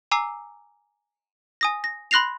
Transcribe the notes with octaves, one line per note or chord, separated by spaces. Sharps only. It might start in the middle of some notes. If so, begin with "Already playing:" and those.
G#5 A#5 D6 E6 C7
G#5 D#6 A#6
A#6
B5 C6 F#6 A#6 C7 F7